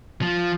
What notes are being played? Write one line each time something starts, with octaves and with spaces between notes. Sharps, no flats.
F3